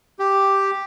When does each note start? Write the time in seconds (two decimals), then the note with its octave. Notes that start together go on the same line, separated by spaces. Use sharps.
0.19 G4